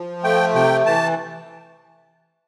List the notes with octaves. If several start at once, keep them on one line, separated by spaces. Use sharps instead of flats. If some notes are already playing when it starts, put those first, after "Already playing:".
Already playing: F3
A3 G5
C3 G5
E3 A5